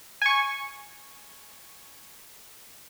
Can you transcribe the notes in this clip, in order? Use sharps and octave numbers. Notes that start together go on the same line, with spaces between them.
G#5 C#6